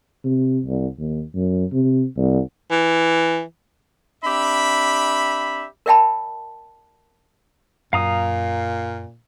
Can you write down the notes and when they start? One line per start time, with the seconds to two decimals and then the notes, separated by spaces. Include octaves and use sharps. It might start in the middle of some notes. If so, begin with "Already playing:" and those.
0.24 C3
0.66 C2
0.99 D#2
1.34 F#2
1.72 C3
2.17 C2
2.71 E3
4.24 C4 D4 G4 E5 B5
5.86 A#4 D5 E5 G5 A5 B5
7.93 F#2 A#2 C#4 F5 A#5 D#6